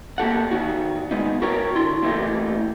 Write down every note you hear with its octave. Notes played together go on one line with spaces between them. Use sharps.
A#3 G4 A4 F#5
D#3 F#4
G#3 B3 D#4
F#4 A#4 B4 C#5 G5 A#5
D3 E4 C6
A#2 E3 A3 A#3 G4